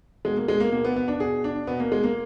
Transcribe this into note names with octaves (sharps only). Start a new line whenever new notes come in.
B2 G#3
A#3
G#3
A#3
B2 A#3
B3
B3
D4
B2 G#4
D4
B2 B3
A#3
G#3
A#3